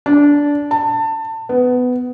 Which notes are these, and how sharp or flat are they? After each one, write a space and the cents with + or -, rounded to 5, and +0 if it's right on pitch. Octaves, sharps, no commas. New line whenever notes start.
D4 -15
A5 +25
B3 +15